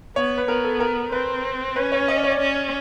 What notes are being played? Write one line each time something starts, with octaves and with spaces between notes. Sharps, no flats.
B3 C#5
B4
B3 A#4
A4
A#4
C4 B4
C#4 B4
C#5
D#5
D5
C#5
D5
C#4